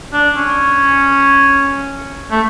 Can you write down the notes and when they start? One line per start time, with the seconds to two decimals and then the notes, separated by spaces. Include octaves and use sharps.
0.13 D4
0.36 C#4
2.31 A3